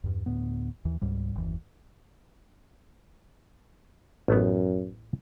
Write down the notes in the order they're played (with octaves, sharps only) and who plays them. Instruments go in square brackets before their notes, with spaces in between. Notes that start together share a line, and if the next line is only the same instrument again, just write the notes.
[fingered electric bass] E2 G2
D2 A2 B3
D#2 E3
C#2 G#2 G3
F#1 D#2 E3
[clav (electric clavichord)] A1 A3 B3 [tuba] F#2